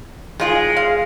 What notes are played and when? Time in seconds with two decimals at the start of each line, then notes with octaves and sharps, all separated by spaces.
0.40 D#3 G#3 F4 G#4
0.76 F5